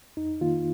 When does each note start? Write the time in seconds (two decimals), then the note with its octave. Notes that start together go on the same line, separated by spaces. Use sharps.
0.17 F2 D#4
0.41 D#3 A#3 F4